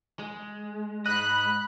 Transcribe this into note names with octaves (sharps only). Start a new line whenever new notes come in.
G#3
G#2 D#5 B5 F#6